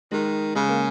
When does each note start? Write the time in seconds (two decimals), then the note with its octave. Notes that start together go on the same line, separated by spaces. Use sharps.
0.11 D#3 G#3
0.55 C#3 G#3
0.68 A#3